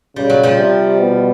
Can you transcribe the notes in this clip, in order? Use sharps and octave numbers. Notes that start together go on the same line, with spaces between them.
C#3 G3
F#3
F3 G3
C3
B2